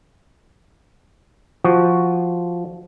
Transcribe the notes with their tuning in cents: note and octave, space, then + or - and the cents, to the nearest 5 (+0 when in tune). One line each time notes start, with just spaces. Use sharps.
F3 +0 F#4 +0